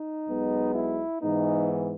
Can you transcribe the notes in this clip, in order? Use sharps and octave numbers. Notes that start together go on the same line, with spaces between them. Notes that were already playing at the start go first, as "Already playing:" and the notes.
Already playing: D#4
B1 B2 G#3 B3
E4
G#2 E3 B3 D#4